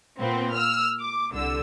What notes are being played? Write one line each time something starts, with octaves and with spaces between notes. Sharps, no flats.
A#2 B3 C4
E6 F6
D6
C2 D3 E6